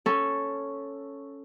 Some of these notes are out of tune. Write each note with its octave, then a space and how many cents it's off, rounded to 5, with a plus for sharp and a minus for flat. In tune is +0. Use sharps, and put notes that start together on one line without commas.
C#4 +0 A4 +0